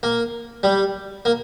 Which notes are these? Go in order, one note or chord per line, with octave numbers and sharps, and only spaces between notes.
A#3
G3
A#3